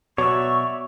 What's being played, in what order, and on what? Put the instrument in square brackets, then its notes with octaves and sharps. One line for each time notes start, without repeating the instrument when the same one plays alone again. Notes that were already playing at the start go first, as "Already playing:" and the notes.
[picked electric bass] B2 [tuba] F#3 [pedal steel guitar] C#5 D5 E5 [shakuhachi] C#6